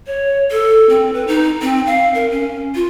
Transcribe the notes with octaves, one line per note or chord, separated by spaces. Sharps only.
C#5
A4
C4
B4
D#4
C4
F5
A#4
C#4
F4